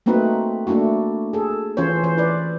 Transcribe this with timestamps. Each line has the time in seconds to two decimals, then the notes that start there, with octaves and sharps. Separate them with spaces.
0.06 A3 A#3 C4 D#4 F#4 B4
0.67 A3 A#3 D4 E4 F#4
1.33 G#4 A4
1.77 E3 C#4 F4 C5 C#5
2.03 E3 C5
2.18 E4 B4 D5